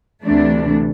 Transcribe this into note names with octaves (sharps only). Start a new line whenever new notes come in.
D2 C3 E3 A3 D4